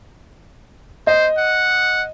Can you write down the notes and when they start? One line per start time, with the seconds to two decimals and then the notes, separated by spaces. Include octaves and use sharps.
1.07 C5 D#5
1.38 F#5